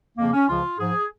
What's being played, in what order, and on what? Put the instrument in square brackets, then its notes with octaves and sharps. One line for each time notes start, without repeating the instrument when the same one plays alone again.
[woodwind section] F2 C#3 F3 A#3
C#4
C#2 C#3 F3 F4
G#2 F3 G#4